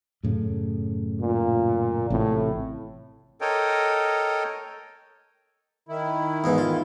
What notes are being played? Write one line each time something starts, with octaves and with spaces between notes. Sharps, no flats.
F#2 A2 C#3
A#2
A1 A2 C3 C4
A4 A#4 C#5 D#5 G5
D#3 E4
E2 G#2 E3
F4